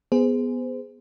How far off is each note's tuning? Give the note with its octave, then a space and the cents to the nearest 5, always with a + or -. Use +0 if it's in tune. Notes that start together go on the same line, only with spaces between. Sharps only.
B3 +0 G#4 +0 C5 -25